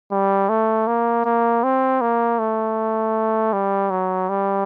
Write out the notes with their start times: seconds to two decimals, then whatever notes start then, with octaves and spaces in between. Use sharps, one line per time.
0.12 G3
0.49 A3
0.87 A#3
1.25 A#3
1.63 C4
2.01 A#3
2.39 A3
3.53 G3
3.90 F#3
4.29 G3